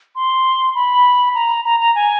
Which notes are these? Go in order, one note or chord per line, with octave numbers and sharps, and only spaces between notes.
C6
B5
A#5
A#5
A#5
G#5